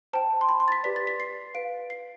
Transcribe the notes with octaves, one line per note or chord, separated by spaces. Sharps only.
C5 G5 A5
C6
B5
C6
A6
B6
G4 B4 D5 B6
A6
B6
C7
B4 F5 D7
C7